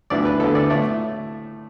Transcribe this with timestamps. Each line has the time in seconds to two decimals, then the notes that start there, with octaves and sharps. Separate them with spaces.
0.10 D2 D3 B3 E4 D5
0.25 B4
0.40 D2 D3 B3 E4 A4
0.55 D5
0.70 A2 A3 E4 D5